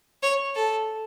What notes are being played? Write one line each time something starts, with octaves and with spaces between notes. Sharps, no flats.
C#5
A4